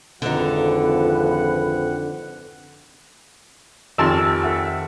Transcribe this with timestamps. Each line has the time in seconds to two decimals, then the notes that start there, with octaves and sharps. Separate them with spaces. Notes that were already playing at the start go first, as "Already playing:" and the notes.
0.22 G#1 F2 D3 F3 D#4 B4 F#5
3.98 G#1 F2 D#3 G4 A4 A5 C6 E6
4.43 A4 E5 F#5